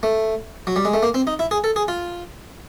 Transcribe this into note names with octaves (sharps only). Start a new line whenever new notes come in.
A3
F#3
G3
G#3
A3
A#3
C4
D#4
E4
G#4
A4
G#4
F4